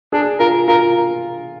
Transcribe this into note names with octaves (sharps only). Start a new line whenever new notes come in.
D4 G#4
F4 A#4
F4 A#4